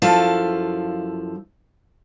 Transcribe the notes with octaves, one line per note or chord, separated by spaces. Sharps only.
F#2 F3 E4 A4 F5 A5